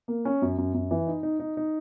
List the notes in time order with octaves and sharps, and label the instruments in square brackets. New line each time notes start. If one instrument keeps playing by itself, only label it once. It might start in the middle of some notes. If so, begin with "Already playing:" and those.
[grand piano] A#3
C#4
F#2
F#2
F#2
E3
D#4
D#4
D#4
D#4